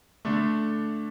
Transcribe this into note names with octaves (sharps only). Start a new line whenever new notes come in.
D3 A3 D4